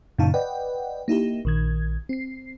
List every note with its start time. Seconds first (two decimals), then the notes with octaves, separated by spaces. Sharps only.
0.18 F#2 A#2 C#3 D#4 F5 A5
0.34 B4 D5 D#5 F#5 G5
1.08 A#3 D#4 E4 G4
1.45 A#1 D#3 G#6
2.09 C4 C7